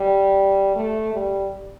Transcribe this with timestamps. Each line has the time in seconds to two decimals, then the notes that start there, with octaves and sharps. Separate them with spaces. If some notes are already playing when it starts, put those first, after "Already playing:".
Already playing: G3
0.75 A3
1.13 G3